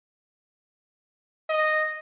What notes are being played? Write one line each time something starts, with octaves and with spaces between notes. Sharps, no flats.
D#5